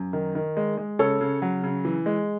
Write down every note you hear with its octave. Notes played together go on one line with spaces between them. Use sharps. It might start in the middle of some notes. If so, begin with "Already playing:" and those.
Already playing: F#2
D#3
D#3
G#3
G#3
C#3 A4 C#5
C#3
F#3
C#3
E3
G#3